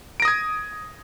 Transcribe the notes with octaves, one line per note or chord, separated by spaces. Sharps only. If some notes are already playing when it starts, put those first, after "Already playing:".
D#6 G#6 A#6 D7